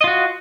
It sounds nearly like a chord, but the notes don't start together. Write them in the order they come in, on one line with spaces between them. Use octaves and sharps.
D#5 F4 F#4